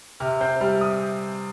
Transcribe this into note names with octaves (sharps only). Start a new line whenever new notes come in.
C3 F6
C4 G6
G3 F6
D#6